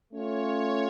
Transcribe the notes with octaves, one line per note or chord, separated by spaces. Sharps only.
A3 C#4 F4 C#5